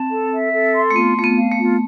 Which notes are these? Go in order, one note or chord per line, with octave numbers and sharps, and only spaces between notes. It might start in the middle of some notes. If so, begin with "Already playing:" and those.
Already playing: C4 A5
A4
E5
A4
C6
A3
B3 F4
A3 F4
B3
F5
A3
F4